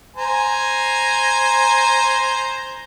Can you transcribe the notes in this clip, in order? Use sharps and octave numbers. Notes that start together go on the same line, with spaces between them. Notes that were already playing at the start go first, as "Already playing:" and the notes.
C5 G#5 A#5